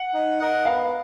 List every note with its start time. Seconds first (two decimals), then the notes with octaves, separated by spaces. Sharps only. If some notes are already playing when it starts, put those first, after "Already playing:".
Already playing: F#5
0.14 D#4
0.39 A#4 D#5 F#5
0.65 B3 F5